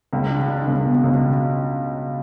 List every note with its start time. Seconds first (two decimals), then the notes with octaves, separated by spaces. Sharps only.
0.13 C#2
0.30 D4
0.48 D4
0.67 C#2
0.85 B2
1.04 C#2